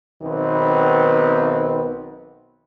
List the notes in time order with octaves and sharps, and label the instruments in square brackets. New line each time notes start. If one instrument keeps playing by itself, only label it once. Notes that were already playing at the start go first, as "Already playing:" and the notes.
[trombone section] B1 D#3 B3 C4 B4